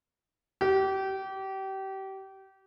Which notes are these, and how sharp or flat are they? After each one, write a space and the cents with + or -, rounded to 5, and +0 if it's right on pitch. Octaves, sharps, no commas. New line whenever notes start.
G4 -30